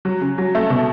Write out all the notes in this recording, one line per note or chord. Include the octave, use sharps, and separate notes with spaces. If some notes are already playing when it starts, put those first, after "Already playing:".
F#3
C#3
F#3
A3
B2